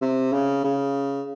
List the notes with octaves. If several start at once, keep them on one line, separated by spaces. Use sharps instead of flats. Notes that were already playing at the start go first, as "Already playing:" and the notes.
C3
C#3
C#3